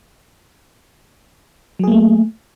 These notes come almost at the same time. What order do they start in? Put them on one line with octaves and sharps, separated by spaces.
F#3 G#4 A#3 A3